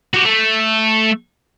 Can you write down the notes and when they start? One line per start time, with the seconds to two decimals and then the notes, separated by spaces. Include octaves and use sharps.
0.14 F#4 G4
0.25 A3